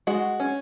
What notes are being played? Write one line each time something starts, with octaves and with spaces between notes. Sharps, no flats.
G#3 F#4
C#4